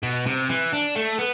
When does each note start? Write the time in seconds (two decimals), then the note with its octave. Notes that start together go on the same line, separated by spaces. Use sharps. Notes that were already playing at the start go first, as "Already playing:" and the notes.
0.03 B2
0.26 C3
0.49 E3
0.73 D4
0.96 A3
1.18 B3